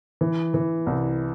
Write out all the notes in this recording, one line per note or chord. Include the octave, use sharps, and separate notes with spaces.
E3
E3
C2